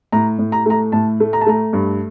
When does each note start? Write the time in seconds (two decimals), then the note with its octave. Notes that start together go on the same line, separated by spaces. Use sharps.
0.12 A2 A#5
0.39 A2
0.52 A#5
0.66 A3 A#5
0.92 A2 A5
1.20 A3
1.33 A#5
1.41 A5
1.46 A3 A#5
1.73 G2